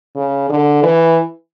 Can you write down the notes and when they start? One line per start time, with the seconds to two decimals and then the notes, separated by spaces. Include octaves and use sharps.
0.16 C#3
0.50 D3
0.83 E3